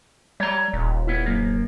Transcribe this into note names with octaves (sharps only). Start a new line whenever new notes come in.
G3 C#5 A#5
D#1
B3 E4
F#2 A#3